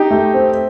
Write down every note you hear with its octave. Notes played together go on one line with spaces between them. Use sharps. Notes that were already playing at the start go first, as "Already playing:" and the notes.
Already playing: D#4 G4
A3
C4